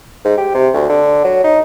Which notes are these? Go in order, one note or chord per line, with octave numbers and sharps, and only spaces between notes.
G#2
G4
C3
D2
D3
F#3
D#4